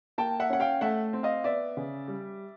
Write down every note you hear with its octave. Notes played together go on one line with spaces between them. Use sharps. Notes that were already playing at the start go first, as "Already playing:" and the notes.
A#3 G5 A5
E5 F#5
C#4 F#5
F5 G5
A3 E5 F#5
C4
D#5 F5
B3 D5 E5
C#3
G3